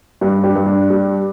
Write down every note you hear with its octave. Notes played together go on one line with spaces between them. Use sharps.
G2 D4 G4
D4 G4
G2
D4
G3